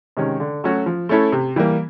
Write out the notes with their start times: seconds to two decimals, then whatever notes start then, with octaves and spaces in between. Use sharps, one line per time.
0.17 C3 D#3 G#3 C#4
0.40 D3
0.64 F#3 A3 C#4 F#4
0.86 F3
1.09 A3 C#4 E4 A4
1.32 C3
1.56 E3 G3 A#3